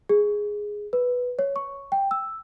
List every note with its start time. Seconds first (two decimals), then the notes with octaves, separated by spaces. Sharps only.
0.09 G#4
0.93 B4
1.39 C#5
1.56 C#6
1.92 G5
2.11 E6